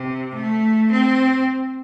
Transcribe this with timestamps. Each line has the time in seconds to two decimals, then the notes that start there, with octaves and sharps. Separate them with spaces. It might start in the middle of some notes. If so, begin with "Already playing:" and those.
Already playing: C3
0.35 A3
0.91 C4